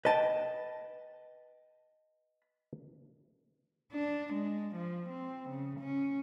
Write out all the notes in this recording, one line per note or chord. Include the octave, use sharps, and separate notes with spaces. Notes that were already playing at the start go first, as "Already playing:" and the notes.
B4 D#5 G5 A5
D4
G#3
F3
C4
C#3
C#4